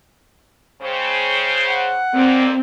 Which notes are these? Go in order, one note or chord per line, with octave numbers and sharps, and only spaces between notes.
C#3 G#3 C5 C#5 G5
F#5
F2 A#3 C4 D5